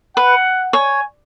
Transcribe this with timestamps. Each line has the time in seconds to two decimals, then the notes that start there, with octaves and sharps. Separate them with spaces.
0.16 B4 F#5
0.73 C#5 G#5